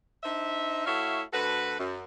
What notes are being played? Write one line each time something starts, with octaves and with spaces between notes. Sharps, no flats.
D4 D#4 C5 E5
A3 E4 F#4 C#5 E5 F5
D2 F#4 A4 B4
F#2